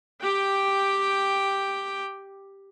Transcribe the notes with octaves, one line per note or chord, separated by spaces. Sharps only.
G4 G5